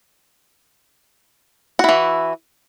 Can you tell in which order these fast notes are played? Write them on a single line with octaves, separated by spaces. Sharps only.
F#4 E4 E3